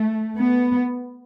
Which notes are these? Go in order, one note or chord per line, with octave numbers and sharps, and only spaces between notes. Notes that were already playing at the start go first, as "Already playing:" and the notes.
Already playing: A3
B3